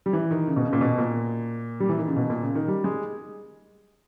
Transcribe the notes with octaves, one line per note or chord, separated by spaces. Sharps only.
G3
E3
D#3
C#3
B2
C#3
A#2
B2
A#2
G3
E3
D#3
C#3
B2
A#2
C#3
D#3
G3
G#3